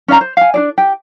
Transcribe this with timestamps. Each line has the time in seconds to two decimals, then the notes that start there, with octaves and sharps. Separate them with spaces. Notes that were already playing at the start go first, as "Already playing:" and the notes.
0.08 C#4 D5 F5 A#5
0.21 C5
0.37 F5 G#5
0.54 D4 G#4 D5
0.78 G4 G5